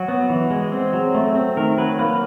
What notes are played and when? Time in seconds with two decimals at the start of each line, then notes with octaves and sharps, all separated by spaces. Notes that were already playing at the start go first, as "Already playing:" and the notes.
Already playing: F#3 F#4
0.08 B3
0.30 E3
0.50 G#3
0.72 C4
0.93 F#3
1.14 A3
1.35 C4
1.57 D#3 A#4
1.78 F#3 B4
1.99 A#3 B4